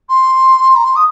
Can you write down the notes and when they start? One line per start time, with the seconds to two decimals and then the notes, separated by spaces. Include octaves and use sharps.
0.09 C6
0.75 A#5
0.84 C6
0.95 D#6